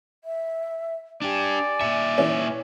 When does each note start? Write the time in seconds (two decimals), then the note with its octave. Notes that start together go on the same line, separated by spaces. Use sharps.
0.24 E5
1.22 D4 G4 D5 G#5
1.81 A#2 E5 C#7
2.18 E3 C#4